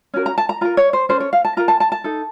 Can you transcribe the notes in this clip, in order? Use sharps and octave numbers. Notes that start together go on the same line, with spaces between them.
C#4 F#4 A#4
A#5
A5
A#5
F4 A#4 A#5
C#5
C5
C#4 A4 C5
C#5
F5
A5
F4 A#4 A#5
A5
A5
A5
D#4 A4